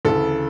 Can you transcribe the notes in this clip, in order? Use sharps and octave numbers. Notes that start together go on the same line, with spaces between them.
D2 C#3 E3 A4